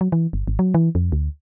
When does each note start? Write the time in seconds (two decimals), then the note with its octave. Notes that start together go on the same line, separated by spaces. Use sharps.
0.01 F#3
0.12 E3
0.33 G1
0.48 G#1
0.59 F#3
0.74 E3
0.95 F2
1.12 D2